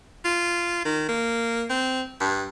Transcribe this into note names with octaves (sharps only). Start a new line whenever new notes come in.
F4
D#3
A#3
C4
G2